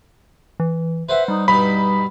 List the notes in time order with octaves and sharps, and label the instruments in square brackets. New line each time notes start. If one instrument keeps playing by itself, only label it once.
[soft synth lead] E3
[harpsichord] B4 C5 F#5 [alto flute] E5
[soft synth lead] G3 [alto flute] D#4
[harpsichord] G2 B2 [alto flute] D#4 [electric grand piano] B5